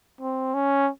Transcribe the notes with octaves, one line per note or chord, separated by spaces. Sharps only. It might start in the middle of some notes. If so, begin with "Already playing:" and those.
C4
C#4